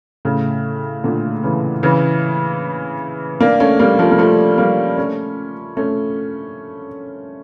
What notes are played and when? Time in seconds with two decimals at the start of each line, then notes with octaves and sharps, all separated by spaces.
0.25 A2 C#3
1.04 A#2 D3
1.43 C#3 E3
1.83 C#3 E3
3.40 A#3 D4
3.60 A3 C#4
3.79 G3 A#3
3.99 F3 A3
4.11 A#3
4.18 F3 A3
4.58 G3 A#3
4.97 A3 C#4
5.77 A3 C#4